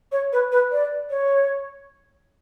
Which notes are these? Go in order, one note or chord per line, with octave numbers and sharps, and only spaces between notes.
C#5
B4
B4
D5
C#5